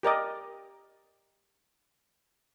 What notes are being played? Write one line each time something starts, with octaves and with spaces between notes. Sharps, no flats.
G4 A#4 D5 D#5